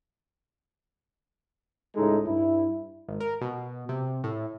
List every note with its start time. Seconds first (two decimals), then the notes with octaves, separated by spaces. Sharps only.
1.96 C#2 A2 G#3 D#4 A4
2.26 G2 E4
3.08 G#1
3.20 A#4
3.41 B2
3.89 C3
4.24 A2